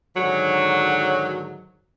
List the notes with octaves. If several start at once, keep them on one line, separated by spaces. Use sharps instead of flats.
G#2 D3 D#3 F#3